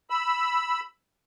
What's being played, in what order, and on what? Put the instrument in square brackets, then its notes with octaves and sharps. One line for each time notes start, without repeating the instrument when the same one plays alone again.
[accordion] B5 E6